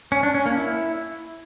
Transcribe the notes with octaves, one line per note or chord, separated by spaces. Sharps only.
C#4
D4
C#4
A#3
E4